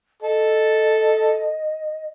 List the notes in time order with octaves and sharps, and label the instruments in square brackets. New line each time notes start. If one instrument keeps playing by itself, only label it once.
[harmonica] A4 [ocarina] D#5